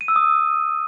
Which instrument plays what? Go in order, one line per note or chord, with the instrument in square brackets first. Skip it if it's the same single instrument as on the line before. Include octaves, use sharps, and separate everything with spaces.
[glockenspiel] D#7
E6
D#6